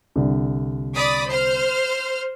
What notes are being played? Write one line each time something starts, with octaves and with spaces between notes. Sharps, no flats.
C2 D3
D5 B5 D#6
C5 F6